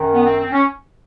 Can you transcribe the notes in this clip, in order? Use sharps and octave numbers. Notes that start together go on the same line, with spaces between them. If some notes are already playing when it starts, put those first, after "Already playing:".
Already playing: F#2 D#3
B3
C4
C4
C#4